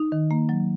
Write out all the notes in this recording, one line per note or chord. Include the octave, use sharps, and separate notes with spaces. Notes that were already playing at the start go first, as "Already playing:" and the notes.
Already playing: D#4
D#3
A#3
F#3